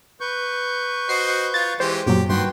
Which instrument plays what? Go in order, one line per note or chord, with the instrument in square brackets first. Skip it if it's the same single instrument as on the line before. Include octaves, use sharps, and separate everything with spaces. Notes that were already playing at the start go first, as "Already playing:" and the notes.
[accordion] B4 C#6 G6
[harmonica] F#4 C5 D#5 [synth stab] C7
[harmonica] F4 [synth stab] A6
[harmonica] E3 G#3 G4 [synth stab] C5
[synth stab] F#2 A#2 F#3 [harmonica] G4
[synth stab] G2 [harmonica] D#3 C6 [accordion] F#4 B4 G5